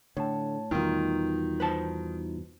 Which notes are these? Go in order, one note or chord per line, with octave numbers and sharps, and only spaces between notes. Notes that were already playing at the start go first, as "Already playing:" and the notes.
A2 D3 C#5 A5
E2 B2 D#3 G3 D#4 F4
B4 C5 A5